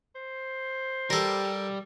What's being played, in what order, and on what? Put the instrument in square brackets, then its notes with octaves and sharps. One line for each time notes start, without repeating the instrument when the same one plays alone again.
[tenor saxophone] C5
[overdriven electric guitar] G3 [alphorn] G4 [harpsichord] A4 A#4